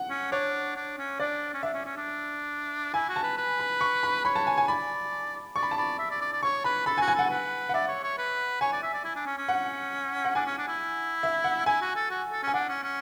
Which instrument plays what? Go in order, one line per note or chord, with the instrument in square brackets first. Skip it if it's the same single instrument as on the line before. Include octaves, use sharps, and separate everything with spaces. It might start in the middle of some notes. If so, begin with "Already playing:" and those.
Already playing: [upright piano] F#5
[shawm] C#4
[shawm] D4 [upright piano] C#5
[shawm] D4
C#4
[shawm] D4 [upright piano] D5
[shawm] C#4
[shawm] D4 [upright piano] E5
[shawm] C#4
C#4
D4
[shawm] E4 [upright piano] G#5
[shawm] F#4
[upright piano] A5
[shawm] B4
B4
[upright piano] B5
C#6
B5
[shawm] C#5 [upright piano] B5
[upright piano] A5
G#5
G#5
[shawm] D5 [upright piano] B5
[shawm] D5 [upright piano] C#6
[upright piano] B5
A5
[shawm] D5 [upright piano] B5
[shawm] E5
D5
D5
D5
[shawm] C#5 [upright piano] C#6
[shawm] B4 [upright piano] B5
[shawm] A4 [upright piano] B5
[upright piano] G#5
[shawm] F#4
[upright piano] G#5
[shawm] A4 [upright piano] F#5
[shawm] B4
[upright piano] F#5
[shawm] D5 [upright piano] E5
[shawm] C#5
C#5
B4
[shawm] C#5 [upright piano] G#5
[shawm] D5
E5
D5
E4
D4
C#4
C#4
[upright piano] F#5
F#5
[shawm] D4 [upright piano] G#5
[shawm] C#4
D4
E4
[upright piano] E5
F#5
[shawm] E4 [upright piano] G#5
[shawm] F#4
A4
F#4
A4
[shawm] C#4 [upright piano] G#5
[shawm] D4 [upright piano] F#5
[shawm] C#4
C#4